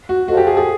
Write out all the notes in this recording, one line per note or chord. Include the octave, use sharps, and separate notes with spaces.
F#4
F4 F#4 A4 C5 D#5
G4
G#4
G#4